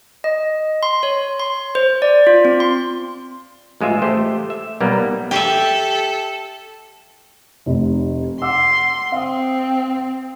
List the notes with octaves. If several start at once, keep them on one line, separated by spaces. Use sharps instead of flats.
D#5
C6
C#5
C6
C5
D5
F4
C4
C6
A1 G#3 F4 E5
A3 G4 C5
E5
B1 G3 A#3 B3
G4 A4 E5
F1 C3 C4
F#5 C6 D6 E6
C4 F5 D#6